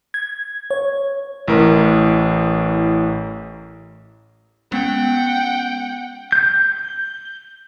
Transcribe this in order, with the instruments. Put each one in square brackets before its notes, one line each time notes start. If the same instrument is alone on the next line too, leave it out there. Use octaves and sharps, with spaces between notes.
[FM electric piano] G#6
C#5
[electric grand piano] A1 A2 A#4
[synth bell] G#3 B3 C#4 [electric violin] F#5 G5
[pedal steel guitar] G6